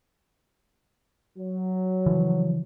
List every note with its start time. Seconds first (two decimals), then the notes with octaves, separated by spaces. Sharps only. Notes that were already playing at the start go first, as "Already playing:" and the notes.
1.38 F#3
2.06 C#3 E3 F3